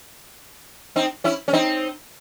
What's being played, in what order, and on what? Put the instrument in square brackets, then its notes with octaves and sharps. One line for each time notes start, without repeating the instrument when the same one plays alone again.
[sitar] C4 D#4
C#4 E4
C#4
C4 D#4